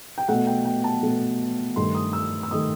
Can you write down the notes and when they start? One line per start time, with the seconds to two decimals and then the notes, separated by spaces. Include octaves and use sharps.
0.18 G5
0.28 B2 A3 F#5
0.47 G5
0.65 G5
0.84 A5
1.03 B2 A3
1.76 G2 D#3 A3 C6
1.95 D#6
2.13 E6
2.43 E6
2.51 D#3 A3 D#6